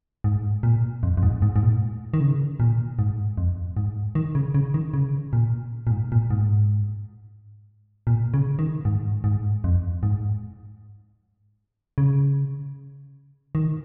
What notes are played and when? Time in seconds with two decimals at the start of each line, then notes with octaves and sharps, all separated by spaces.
0.24 G#2
0.63 A#2
1.03 F2
1.17 F2
1.23 G#2
1.42 G#2
1.56 G#2
1.62 A#2
2.14 D#3
2.20 C#3
2.60 A#2
2.99 G#2
3.38 F2
3.77 G#2
4.15 D#3
4.35 C#3
4.55 C#3
4.74 D#3
4.94 C#3
5.33 A#2
5.87 A#2
5.91 G#2
6.12 A#2
6.30 G#2
8.07 A#2
8.34 C#3
8.59 D#3
8.85 G#2
9.24 G#2
9.64 F2
10.03 G#2
11.98 C#3
13.55 D#3